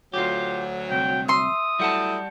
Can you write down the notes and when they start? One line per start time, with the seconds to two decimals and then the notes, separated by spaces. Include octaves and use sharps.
0.14 D2 F#3 F4 G4
0.90 C2 G5
1.28 E5 C6 D#6
1.79 F#3 G3 A3 E4 F#5 A5